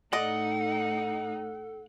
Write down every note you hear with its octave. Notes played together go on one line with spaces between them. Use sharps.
A2 D#4 A4 D5 D#5 F#5